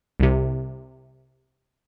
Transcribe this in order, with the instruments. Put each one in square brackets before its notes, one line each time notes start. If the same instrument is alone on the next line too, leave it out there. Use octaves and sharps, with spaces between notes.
[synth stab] C2 C3